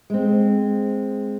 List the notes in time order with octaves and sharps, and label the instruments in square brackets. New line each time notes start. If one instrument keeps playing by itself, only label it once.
[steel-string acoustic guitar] G#3 C4